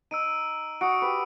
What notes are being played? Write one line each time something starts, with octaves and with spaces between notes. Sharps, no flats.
D#4 E6 D7 D#7
F#4 D#6 C#7 D7
G4 B4